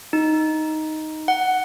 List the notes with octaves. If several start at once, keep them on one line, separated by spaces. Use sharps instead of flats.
D#4
F#5